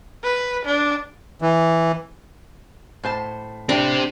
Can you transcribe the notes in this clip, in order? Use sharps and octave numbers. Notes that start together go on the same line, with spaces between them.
B4
D4
E3
A2 C5 A5
A2 C4 D4 G4